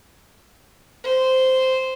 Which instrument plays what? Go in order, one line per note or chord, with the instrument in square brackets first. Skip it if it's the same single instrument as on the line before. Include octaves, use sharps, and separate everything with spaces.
[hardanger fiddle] C5